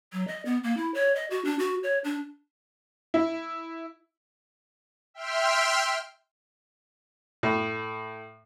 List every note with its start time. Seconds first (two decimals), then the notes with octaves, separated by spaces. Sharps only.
0.13 F#3
0.28 D#5
0.45 B3
0.63 A#3
0.77 E4
0.94 C#5
1.15 D#5
1.30 F#4
1.45 D4
1.59 F#4
1.83 C#5
2.04 D4
3.14 E4
5.14 E5 G5 C6 F6
7.43 A2